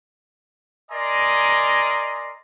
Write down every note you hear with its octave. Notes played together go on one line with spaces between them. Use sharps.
A#4 D5 D#5 G#5 A#5 C6